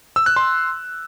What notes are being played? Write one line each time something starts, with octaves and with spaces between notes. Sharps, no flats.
E6
F#6
C6